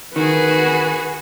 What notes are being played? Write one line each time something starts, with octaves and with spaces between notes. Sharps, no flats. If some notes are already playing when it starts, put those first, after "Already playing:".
D#3 F#4 G#4 B4